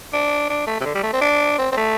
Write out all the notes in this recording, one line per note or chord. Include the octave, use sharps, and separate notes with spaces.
D4
D4
A3
C3
D3
G3
A3
C4
D4
C4
C4
A3